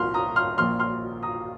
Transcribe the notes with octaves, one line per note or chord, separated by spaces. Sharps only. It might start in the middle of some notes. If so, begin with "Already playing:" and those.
Already playing: C2 A#2 F3 A#3 C6 F6
A#5 D#6
C6 F6
A#1 A#2 F3 A#3 C6 F6
C6 F6
A#5 D#6